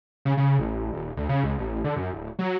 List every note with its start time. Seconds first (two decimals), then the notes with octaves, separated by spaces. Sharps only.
0.25 C#3
0.37 C#3
0.59 A1
0.92 D#1
1.17 D2
1.29 C#3
1.44 C#2
1.58 A1
1.84 D3
1.96 F#2
2.13 D1
2.39 F#3